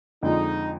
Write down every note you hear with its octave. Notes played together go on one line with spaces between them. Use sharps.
F2 D3 F3 G#3 D#4